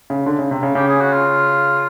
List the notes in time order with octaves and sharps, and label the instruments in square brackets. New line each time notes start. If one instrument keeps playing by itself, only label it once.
[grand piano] C#3
D3
C#3
C3
C#3
[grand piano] C#3 [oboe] G4
[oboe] G#4
F#4
F4